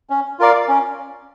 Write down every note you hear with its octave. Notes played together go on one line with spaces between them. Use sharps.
C#4
F4 A#4 D5 F5
C#4